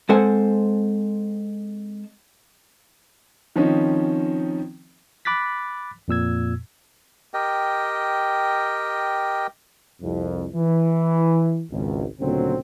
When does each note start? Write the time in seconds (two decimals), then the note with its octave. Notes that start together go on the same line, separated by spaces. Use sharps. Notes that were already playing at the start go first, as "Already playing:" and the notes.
0.09 G#3 C4 A4 C5 F#5 G#5
3.56 D#3 F3 C4 C#4 D#4
5.25 B5 D6 F#6 A6 B6
6.08 F2 A#2 E6 G#6
7.34 G4 A#4 D#5 G5
10.02 C2 F2
10.55 E3
11.71 G#1 C#2
12.20 D2 A#2 C#3 F#3 C4